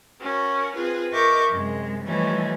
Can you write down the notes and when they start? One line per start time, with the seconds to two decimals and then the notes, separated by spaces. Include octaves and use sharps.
0.20 C#4 F#4 A#4
0.74 C4 F4 G#4 B4
1.12 A#4 D#5 E5 C#6 D6 G6
1.50 F#2 C3 G#3
2.04 E3 F3 G3 A3 C#4 D#4